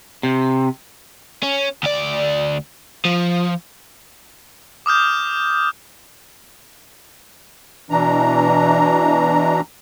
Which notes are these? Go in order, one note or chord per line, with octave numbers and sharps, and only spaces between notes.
C3
C#4
D2 D5
F3
D6 D#6 F6 G6
B2 E3 D4 A#5